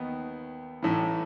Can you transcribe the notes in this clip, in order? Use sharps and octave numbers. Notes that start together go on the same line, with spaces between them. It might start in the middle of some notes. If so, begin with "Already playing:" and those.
Already playing: D#2 D#3 B3
A1 A2 E3